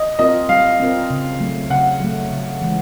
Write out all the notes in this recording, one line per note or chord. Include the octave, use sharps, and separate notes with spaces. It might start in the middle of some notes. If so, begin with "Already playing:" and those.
Already playing: D#5
C4 F4 A#4 D#5
G3 F5
C4 F4 A#4
C#3
F#3 A3
C#3 F#5
F#3 A3
C#3
E3 G#3